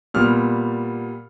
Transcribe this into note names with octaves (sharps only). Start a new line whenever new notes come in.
A#2 G3 B3 F6